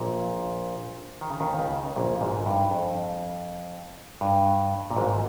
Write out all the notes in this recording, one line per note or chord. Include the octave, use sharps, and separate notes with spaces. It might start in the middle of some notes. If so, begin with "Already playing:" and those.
Already playing: A#1 A#2
D#3
C#3
D#2 D#3
C#2 C#3
A#1 A#2
G#1 G#2
G2
F2
G2
A#2
G#1 G#2